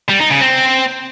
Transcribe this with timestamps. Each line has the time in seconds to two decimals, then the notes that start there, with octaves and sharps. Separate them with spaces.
0.09 G3
0.20 D#4
0.30 C#3
0.41 C4